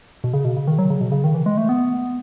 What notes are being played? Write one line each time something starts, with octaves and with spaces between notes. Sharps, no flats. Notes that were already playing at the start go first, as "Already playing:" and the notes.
B2
C#3
B2
C#3
D#3
F#3
C#3
B2
C#3
D#3
E3
G#3
A3
B3